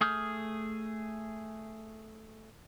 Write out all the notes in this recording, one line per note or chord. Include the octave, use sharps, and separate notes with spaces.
A3 G#4 D#6 F6 G6